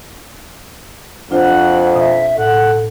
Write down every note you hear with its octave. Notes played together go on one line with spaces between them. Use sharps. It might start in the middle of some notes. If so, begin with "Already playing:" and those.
F2 D4 F4 C5 F#5
B2 E5
A2 A4 F#5